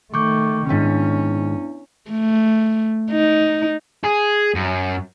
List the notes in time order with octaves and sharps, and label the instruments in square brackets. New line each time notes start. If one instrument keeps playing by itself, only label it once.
[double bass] D#3 A3 [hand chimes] C#6 D6 G6
[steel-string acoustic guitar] G#2 D#3 [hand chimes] B3 D4 E4 [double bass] C#4
[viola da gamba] A3
D#4
[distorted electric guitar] G#4
F#2